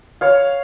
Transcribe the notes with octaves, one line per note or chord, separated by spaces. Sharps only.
C#5 F5